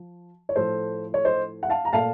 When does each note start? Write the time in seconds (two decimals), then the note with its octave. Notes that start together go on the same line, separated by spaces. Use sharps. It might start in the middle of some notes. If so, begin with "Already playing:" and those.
Already playing: F3
0.49 C#5
0.56 A2 F3 A3 A4 C5
1.14 C#5
1.24 C5 D#5
1.63 F#5
1.70 F5 A5
1.85 A#5
1.93 A#2 A3 F5 A5